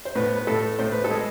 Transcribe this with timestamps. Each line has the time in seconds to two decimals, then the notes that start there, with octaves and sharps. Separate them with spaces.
0.05 C5
0.15 A2 B3 B4
0.35 B4
0.47 A2 A3 A4
0.79 A2 C5
0.92 B4
1.04 A4
1.10 G#3